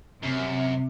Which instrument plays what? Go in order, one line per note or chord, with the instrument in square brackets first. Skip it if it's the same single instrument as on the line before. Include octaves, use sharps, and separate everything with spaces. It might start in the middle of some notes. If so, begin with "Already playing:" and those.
[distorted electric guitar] F#2 [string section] C3